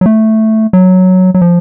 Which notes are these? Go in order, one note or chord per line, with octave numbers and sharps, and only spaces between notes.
F#3
A3
F#3
F#3
F3